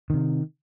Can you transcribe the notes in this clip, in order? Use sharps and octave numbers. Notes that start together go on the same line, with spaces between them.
C3 D#3